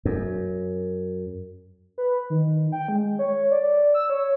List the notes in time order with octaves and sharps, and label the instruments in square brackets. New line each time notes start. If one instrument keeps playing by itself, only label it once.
[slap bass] F#2
[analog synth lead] B4
D#3
G5
G#3
C#5
D5
E6
C#5